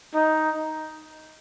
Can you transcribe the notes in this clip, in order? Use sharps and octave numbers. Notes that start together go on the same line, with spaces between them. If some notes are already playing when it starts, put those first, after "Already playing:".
D#4